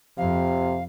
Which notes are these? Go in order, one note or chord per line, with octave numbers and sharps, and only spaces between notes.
F2 C3 F5